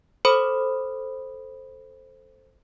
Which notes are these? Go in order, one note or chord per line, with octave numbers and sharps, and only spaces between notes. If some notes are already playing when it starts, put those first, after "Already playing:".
A4 C5 B5 D#6